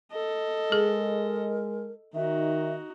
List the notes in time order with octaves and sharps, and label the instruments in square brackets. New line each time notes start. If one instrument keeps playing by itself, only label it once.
[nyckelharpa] A4 D#5
[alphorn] G#3 [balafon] G#4 [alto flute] A#4
[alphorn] D#3 [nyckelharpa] D#4 F#4 [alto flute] E5